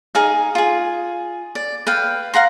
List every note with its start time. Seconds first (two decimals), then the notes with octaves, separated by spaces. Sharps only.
0.15 D#4 G#4 F5
0.55 F4 G#4
1.55 D5
1.87 B4 F5 G5
2.34 F5 F#5 A#5 C6